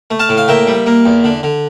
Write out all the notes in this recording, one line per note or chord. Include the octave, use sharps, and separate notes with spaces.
A3
F5 A5
A2
F5
A#3 E5 G5
G3
A#3
E2
D3
D3